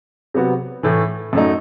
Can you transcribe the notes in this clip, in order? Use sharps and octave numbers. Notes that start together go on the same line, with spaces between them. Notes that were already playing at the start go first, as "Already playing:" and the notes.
C3 F#3 B3 F#4
A2 E3 A3
F#2 F#3 A3 D#4